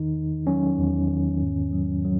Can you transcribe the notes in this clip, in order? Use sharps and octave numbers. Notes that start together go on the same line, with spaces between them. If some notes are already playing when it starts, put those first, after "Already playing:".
Already playing: E2 D#3 D#4
E2
F#3 C#4
E2
D#3
G#2
F#3
F#3